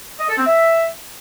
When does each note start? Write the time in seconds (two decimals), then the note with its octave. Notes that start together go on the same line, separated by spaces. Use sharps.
0.20 D#5
0.29 A4
0.38 C4
0.46 E5